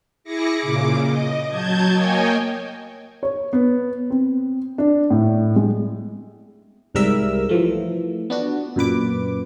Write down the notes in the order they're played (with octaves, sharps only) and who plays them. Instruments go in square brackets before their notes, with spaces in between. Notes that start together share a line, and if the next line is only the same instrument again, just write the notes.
[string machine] E4 G#4 D6 A#6 C#7
A#2 C#3 D6
D#5
F#3 A5 G6 G#6
A#3 C#5 D#5 G5 G#5
[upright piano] C#5
B3
C4
D4
A2
G#3
[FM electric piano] C2 G#2 G3 A#4 E5 E6
E3 F3 A3
B3 D4 F#4
F#2 A#2 B4 D6